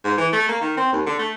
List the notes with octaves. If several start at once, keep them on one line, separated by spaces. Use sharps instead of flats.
G#2
E3
A3
A#3
D#3
C4
D#2
D3
A3